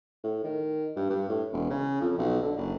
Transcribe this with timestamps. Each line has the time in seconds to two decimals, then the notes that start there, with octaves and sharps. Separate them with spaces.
0.24 A2
0.43 D#3
0.96 G2
1.10 G2
1.29 A2
1.53 E1
1.70 C#3
2.01 F2
2.18 B1
2.42 D3
2.57 F#1